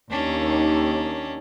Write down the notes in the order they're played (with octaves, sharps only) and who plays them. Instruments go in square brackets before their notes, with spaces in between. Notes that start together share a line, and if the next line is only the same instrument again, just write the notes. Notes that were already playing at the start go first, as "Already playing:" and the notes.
[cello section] D#2 [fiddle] C#4 D4